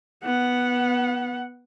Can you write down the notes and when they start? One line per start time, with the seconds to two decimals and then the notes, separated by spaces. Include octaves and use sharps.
0.24 B3 F#5